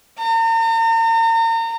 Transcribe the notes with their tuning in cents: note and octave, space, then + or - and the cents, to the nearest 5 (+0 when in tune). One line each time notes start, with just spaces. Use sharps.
A#5 -40